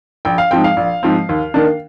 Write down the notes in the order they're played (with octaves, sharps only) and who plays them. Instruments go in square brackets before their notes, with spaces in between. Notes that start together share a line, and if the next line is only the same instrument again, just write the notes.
[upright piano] A#1 G5
F5
G#2 F3 C4 G5
F5
A#1
G#2 F3 C4
D#2
D#3 A#3 D4